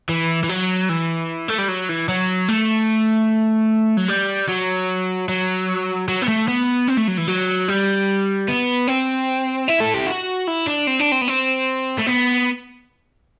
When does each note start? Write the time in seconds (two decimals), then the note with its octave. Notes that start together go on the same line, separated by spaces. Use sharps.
0.09 E3
0.43 E3
0.49 F#3
0.89 E3
1.48 A3
1.58 G3
1.68 F#3
1.89 E3
2.08 F#3
2.48 A3
3.97 F#3
4.09 G3
4.49 F#3
5.29 F#3
6.09 F#3
6.22 B3
6.28 A3
6.48 B3
6.88 C4
6.98 A3
7.08 F#3
7.18 E3
7.27 F#3
7.68 G3
8.48 B3
8.88 C4
9.68 E4
9.80 A4
9.94 G4
10.07 F#4
10.47 E4
10.67 D4
10.87 C4
10.99 D4
11.12 C4
11.21 B3
11.28 C4
11.99 A3
12.07 B3